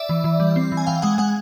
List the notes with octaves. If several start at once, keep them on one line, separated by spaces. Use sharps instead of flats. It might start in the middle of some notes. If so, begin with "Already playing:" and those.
Already playing: D5 E5
E3
E3
G3
C4
E3
G#5
E3 F5 G5
G#3 F#5 G#5
G#3 F#5 G#5